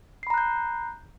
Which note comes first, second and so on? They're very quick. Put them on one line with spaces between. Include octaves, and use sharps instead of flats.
C7 B5 A#5 F#6 G6